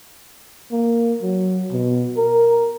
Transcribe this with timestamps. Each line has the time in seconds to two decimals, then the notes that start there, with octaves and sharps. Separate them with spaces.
0.71 A#3
1.22 F#3
1.72 B2
2.17 A#4